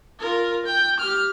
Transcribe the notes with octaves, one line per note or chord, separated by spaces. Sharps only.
F4 A#4
G5
G4 F6